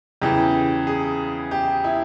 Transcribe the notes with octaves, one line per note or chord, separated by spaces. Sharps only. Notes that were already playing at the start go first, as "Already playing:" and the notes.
E2 C#3 E3 G4
G#4
G4
E4